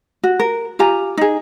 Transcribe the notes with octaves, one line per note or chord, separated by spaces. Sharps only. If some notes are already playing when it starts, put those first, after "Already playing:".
F#4
A#4
F4 G4 G#5 A#5
D#4 G#4